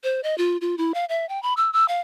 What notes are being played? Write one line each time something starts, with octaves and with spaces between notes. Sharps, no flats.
C5
D#5
F4
F4
E4
F5
E5
G5
B5
E6
E6
F5